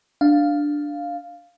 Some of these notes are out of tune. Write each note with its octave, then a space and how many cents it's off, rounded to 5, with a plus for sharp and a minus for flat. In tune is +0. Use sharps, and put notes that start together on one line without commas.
D4 +0 F5 +0